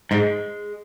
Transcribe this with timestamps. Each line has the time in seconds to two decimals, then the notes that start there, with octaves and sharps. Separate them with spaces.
0.11 G#2 G#3